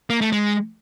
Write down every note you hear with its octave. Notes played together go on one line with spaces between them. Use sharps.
A#3
A3
G#3